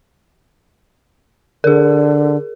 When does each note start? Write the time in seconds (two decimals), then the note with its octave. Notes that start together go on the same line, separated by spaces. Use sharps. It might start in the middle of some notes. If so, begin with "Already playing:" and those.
1.64 D3 G#4 A#4